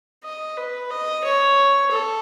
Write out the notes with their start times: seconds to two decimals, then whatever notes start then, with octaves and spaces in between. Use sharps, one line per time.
0.24 D#5
0.57 B4
0.90 D#5
1.24 C#5
1.91 A4